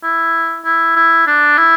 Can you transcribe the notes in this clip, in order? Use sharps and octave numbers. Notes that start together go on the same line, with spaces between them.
E4
E4
E4
D4
E4